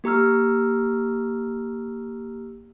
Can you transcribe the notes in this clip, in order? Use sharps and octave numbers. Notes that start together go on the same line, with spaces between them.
A#3 G4 A#5 E6 F6